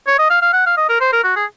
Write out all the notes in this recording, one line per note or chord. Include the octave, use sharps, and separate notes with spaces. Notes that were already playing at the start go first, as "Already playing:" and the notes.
C#5
D#5
F5
F5
F#5
F5
D#5
A#4
C5
A#4
F#4
G#4